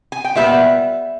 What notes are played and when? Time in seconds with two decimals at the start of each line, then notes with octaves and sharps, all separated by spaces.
0.12 G#5
0.25 G5
0.36 A#2 G3 B3 E5